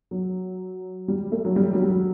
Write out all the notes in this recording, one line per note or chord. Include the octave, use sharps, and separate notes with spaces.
F#3
G3
A3
F#3
G3
F#3
G3
F#3